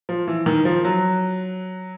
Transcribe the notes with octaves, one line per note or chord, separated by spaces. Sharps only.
F3
E3
D#3
F3
F#3